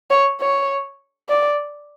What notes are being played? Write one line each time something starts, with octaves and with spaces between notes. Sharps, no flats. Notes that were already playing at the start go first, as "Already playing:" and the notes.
C#5
C#5
D5